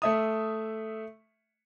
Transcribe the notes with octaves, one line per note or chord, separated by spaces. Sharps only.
A3 E5 D#6